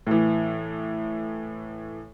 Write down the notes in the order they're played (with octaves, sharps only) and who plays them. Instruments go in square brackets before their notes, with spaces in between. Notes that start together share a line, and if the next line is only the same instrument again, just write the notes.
[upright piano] A2 E3